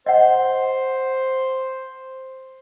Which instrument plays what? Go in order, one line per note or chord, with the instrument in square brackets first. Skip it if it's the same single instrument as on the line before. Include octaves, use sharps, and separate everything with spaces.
[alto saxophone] C5 [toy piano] D#5 F#5